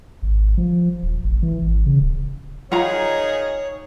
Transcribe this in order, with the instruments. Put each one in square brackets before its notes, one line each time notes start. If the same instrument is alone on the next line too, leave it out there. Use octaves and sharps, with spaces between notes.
[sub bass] G#1
F3
D#1
A1
E3
G#1
C#3
D1
[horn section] D#3 D#4 G#4 [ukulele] F4 F#5 A#5 [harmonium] C#5